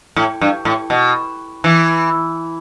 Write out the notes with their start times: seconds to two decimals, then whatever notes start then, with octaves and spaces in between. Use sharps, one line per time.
0.16 A2
0.41 G2
0.65 A2
0.90 B2
1.64 E3